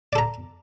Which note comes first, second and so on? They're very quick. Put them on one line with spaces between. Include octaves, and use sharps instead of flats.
D5 A4 A#5